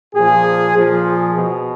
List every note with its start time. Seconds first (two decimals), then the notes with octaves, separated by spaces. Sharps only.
0.14 A#2 F3 G#4
0.75 A#2 F3
1.05 G#4
1.35 B2